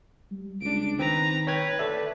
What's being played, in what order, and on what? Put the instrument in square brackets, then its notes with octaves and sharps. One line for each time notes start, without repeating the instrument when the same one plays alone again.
[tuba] G3
[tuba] C#2 [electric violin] D4 D7
[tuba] D#3 [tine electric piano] C4 [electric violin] B4 A#5
[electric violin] B4 [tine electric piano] C#5 G5 G#6
[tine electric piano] A4 D5 E5